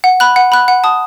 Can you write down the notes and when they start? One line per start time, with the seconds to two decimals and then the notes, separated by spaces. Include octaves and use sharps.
0.04 F#5
0.20 B5 F#6
0.36 F#5
0.52 B5 F#6
0.68 F#5
0.84 A5 D#6